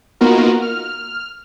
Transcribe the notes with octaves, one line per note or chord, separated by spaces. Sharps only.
A#3 B3 D#4 F4 F#4 A#4
F6